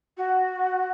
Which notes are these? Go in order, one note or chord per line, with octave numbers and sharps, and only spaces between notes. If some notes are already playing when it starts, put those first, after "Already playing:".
F#4